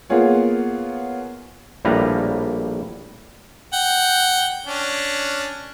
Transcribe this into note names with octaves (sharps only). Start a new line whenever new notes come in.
A#3 B3 F4 G#4 C#5
A#1 A2 G3 A#3 B4 A#5
F#5 G5
C#4 D4